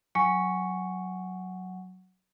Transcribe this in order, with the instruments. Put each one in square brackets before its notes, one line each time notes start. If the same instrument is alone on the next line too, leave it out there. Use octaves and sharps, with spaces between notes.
[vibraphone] F#3 [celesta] G#5 C#6 C#7